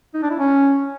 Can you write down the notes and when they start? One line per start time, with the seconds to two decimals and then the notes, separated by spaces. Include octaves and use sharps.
0.14 D#4
0.22 D4
0.30 E4
0.39 C#4